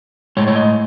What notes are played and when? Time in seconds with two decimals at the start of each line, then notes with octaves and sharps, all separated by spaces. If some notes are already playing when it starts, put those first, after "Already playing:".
0.37 A2 G#3 C#5
0.47 C#5
0.56 D#5